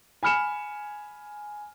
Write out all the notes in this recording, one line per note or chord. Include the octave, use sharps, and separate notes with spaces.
G#5 B5 F6 C#7 E7